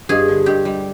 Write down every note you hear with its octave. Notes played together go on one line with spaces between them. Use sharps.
G2 G#4
D3
G2 G4
G3